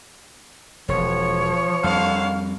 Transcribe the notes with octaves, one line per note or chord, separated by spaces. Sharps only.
E1 F3 C#5
F2 D3 D#3 G3 F5